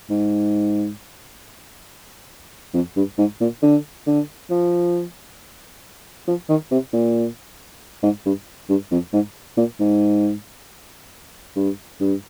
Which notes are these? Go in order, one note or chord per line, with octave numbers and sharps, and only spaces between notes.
G#2
F2
G2
G#2
A#2
D3
D3
F3
F3
D#3
C3
A#2
G#2
G2
G2
F2
G#2
A#2
G#2
G2
G2